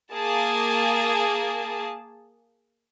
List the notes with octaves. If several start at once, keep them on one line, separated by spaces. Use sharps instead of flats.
A#3 G#4 A5